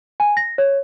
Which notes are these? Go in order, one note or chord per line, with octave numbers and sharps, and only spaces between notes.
G#5
A#6
C#5